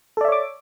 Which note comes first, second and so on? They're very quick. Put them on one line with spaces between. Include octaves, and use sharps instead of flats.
A4 D5 E5 C#5 D6